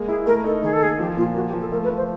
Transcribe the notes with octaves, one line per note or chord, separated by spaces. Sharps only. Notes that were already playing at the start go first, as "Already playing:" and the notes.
Already playing: G#3 A#3
E4 G#4
A3 A#4
D#4 A4
D#3 G#4
A4
A#3 G#4
F3 G4
A#2 F4
A#3 F#4
G4
F3
A4
A3 A#4
B4
F3
C5